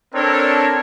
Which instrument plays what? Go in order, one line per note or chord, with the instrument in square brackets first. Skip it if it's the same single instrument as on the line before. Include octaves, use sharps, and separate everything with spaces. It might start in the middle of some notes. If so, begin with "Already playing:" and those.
[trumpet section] C4 D4 A4 A#4 C#5